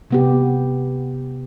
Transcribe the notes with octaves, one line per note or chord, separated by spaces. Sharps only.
C3 B3 G4